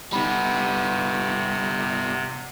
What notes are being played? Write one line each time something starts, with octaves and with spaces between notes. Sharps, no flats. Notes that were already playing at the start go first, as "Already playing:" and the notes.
C3 G3 B3 D#4 B5